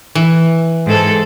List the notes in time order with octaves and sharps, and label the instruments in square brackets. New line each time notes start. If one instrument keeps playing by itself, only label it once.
[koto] E3
[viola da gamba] G#2 A4